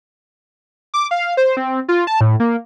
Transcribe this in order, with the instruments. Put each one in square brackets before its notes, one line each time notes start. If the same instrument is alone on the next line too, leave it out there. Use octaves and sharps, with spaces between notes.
[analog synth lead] D6
F5
C5
C4
F4
A5
A2
A#3